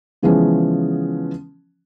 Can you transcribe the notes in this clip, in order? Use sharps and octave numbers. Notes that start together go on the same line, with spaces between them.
C#3 E3 F3 G#3 B3 C#4